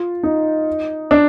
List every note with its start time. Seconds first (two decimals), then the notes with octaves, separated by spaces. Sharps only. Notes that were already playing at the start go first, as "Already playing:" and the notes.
Already playing: F4
0.23 D#4
1.11 D4